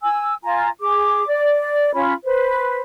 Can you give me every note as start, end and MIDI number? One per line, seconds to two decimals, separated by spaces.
0.02 0.34 80
0.02 0.34 88
0.44 0.68 65
0.44 0.68 80
0.44 0.68 82
0.80 1.26 68
0.80 1.26 86
1.28 1.93 74
1.94 2.13 61
1.94 2.13 65
1.94 2.13 83
2.24 2.81 71
2.24 2.81 72